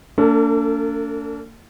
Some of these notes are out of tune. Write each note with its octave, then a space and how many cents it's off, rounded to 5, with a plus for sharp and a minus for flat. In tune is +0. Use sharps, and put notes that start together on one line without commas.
A#3 -40 D4 -35 A4 +35